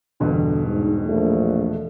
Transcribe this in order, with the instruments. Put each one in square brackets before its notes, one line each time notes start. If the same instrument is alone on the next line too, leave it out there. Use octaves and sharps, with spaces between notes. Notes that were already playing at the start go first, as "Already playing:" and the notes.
[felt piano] E1 G2 B2 [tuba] D3
[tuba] G#2
[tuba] A#1 [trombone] A3